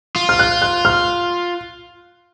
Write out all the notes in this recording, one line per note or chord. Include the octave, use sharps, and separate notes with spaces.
F4
F6
F#6
F#6
F6